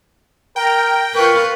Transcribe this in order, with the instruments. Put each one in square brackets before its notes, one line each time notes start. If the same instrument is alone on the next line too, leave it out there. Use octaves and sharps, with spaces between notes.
[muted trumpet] A#4 [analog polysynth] G5
[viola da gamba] F4 B4 [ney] A#4 [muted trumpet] C#6